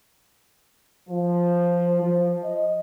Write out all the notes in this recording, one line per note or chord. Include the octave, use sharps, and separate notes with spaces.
F3
F3
D#5